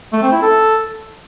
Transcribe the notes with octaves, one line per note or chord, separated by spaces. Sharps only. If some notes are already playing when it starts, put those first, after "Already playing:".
A3
C4
E4
A4